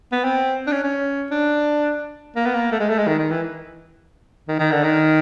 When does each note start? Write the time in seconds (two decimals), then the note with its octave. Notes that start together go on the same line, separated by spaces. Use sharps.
0.12 B3
0.24 C4
0.67 D4
0.72 C#4
0.83 C#4
1.31 D4
2.36 A#3
2.46 B3
2.55 A#3
2.72 A3
2.80 G#3
2.89 A3
2.98 G#3
3.07 D#3
3.19 D#3
3.31 E3
4.48 D#3
4.59 D#3
4.71 D3
4.83 D#3